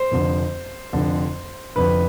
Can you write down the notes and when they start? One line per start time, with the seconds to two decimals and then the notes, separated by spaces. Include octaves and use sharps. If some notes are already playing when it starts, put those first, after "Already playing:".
Already playing: C5
0.11 F1 F2 D3
0.93 F1 F2 D3
1.76 F1 F2 D3 B4